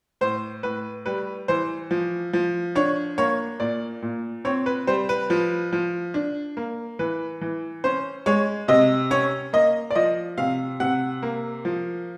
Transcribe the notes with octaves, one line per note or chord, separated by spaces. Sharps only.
A2 C5
A2 B4
G3 B4
E3 C5
F3
F3
D4 C#5
A#3 C#5
A#2 D5
A#2
C4 C#5
B4
G3 C5
B4
F3
F3
D4
A#3
E3 B4
E3
C#4 C5
G#3 C#5
C3 D#5
C#4 C#5
A#3 D#5
D5
F3 D#5
C3 F5
C3 F#5
A#3
F3